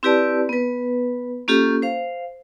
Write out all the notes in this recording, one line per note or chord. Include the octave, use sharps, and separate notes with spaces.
C4 E4 G4 B4 D5 A5
B3 B4
A#3 C#4 F4 G4 A4
C5 F5